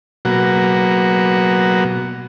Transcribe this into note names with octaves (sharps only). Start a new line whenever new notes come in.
B2 F#3 A#3 F#4